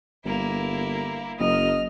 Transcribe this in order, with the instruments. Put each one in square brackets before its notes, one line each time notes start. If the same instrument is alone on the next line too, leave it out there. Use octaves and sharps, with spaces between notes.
[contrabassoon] G1 [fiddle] A#3 E4
[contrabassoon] F#1 [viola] D#5 [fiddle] F6